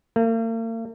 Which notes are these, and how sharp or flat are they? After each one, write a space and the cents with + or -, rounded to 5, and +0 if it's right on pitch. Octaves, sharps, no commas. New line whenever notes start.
A#3 -45